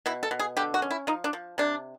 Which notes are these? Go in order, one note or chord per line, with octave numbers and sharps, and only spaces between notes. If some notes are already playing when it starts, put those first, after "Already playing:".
B2 E4
A4
B2
G#4
D3 G4
F#4
C#4
E4
F3 D#4
D4
F3
C3 D4